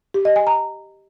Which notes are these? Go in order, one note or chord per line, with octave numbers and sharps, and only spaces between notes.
G4
D#5
G#5
A#5